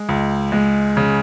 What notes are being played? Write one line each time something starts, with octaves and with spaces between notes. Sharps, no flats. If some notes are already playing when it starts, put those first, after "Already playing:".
Already playing: G#3
C#2
G#3
C#3